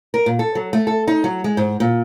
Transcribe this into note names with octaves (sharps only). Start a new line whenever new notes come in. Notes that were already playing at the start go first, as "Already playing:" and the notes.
A#4
A#2
A4
F#3
A3
A4
D#4
F#3
G#3
G#2
A#2